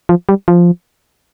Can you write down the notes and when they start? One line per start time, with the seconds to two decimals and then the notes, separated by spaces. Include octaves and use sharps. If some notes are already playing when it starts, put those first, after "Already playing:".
0.09 F3
0.29 G3
0.48 F3